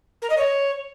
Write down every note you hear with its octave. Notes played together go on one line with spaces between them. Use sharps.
A#4
D#5
C#5